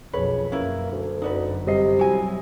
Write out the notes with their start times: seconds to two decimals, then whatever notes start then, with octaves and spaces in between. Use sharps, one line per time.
0.13 B1 F2 C#3 B4 C#5
0.52 F#2 A#3 C#4 E4 B4
0.92 D2
1.22 G1 F#2 D#4 F#4 B4 D5
1.67 C3 G3 D#5 C7
1.99 F#3 E4 F#4 G#5